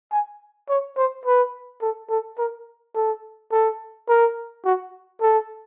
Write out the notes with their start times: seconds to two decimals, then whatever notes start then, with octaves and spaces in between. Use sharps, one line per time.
0.12 G#5
0.69 C#5
0.97 C5
1.25 B4
1.82 A4
2.10 A4
2.38 A#4
2.95 A4
3.52 A4
4.09 A#4
4.65 F#4
5.21 A4